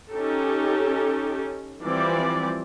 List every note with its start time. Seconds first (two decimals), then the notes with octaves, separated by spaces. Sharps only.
0.11 C#4 D#4 G4 A4
1.83 E3 F3 G3 C4 D5